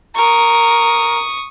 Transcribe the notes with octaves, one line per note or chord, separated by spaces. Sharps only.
A#4 C#6 D#6